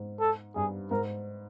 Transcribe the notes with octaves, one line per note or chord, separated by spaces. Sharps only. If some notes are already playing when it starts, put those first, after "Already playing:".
Already playing: G#2
A4
G2 G#4
G#2 A#4